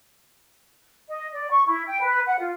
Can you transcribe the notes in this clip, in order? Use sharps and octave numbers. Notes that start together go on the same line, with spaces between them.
D#5
D5
C#6
E4
G5
B4
F#5
F4